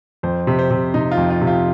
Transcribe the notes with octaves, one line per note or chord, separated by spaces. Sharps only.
F2 C5
C3
C5
C3
C3 D#4
F4
F2
F4
C3
F4